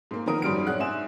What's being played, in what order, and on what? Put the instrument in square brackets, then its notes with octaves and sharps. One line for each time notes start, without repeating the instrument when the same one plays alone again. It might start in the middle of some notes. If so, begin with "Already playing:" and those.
[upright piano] G#2 A#3
D#3 F3 B3 A#4 D#6
F#1 G#2 F#3 G3 F6 D7
A1 C#4 D4 G#4 F#5 F#6
G#2 E5 G#5 E7